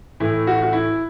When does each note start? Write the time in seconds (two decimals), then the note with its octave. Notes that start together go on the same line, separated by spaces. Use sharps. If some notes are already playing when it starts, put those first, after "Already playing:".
0.20 A2 E3 A3 E4
0.47 F#4
0.62 F#4
0.73 E4